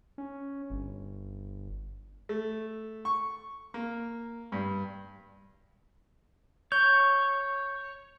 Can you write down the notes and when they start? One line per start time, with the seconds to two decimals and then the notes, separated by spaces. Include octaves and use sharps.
0.18 C#4
0.70 G1
2.29 A3
3.05 C#6
3.74 A#3
4.52 G2
6.72 C#5 G6